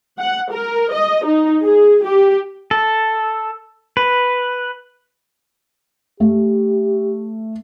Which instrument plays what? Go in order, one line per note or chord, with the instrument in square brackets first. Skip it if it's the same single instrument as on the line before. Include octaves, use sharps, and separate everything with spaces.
[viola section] F#5
A#4
D#5
D#4
G#4
G4
[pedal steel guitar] A4
B4
[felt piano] A3 [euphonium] G4